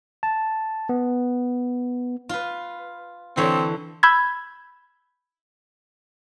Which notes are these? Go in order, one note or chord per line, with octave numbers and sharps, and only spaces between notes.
A5
B3
F4 B4
D3 E3 C4 C#5
B5 E6 G6 G#6